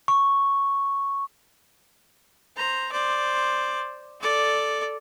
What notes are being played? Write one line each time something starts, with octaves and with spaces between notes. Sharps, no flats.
C#6
C5 A#5
C5 D5
A4 D5